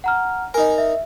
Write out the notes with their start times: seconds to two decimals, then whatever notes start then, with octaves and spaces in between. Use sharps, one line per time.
0.04 F#5 A#5 F6
0.54 D#4 A#4 G#5
0.78 E5